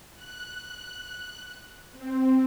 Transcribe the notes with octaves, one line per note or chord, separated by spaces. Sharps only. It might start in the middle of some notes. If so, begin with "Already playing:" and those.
F#6
C4